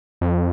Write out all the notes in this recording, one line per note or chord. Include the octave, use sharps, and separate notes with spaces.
F2